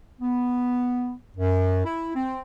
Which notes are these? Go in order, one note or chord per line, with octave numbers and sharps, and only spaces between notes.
B3
F#2
E4
C4